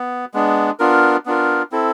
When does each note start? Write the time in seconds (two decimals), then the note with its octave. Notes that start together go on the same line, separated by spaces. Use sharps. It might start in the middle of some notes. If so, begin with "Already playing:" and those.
Already playing: B3
0.34 G#3 B3 D4
0.79 B3 D4 F4 A#4
1.26 B3 D4 F4 A#4
1.72 C4 E4 A4